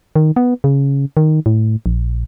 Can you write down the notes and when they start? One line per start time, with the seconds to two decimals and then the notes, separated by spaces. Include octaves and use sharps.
0.16 D#3
0.36 B3
0.64 C#3
1.17 D#3
1.46 A2
1.86 A#1